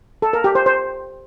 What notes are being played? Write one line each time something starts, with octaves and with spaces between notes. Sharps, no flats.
A4
A#4
G4
C5
C5